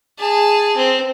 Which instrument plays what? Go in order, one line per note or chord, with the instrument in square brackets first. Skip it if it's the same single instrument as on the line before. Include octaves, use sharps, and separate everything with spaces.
[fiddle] G#4 A5
C4